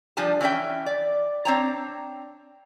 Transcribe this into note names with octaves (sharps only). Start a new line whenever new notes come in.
F3 G3 D4 G#5 A5
E3 C#4 E4 E5 G5
D5
C4 D4 C#5 G5 A5 A#5